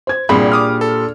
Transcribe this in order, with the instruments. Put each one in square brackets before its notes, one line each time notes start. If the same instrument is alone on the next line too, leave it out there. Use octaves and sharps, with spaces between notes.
[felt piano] C5 G#6
[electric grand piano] C2 [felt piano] A#2 D4 G#4 [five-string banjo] G3 C4 B5
[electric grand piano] D6 D#6 F6
A4